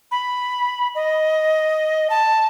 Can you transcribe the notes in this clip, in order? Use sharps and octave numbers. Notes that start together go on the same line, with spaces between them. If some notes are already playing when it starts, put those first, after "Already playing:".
B5
D#5
A5